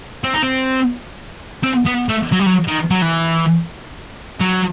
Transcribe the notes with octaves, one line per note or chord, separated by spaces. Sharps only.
C4
D#4
C4
C4
B3
A3
F#3
G3
F#3
D#3
F#3
E3
F#3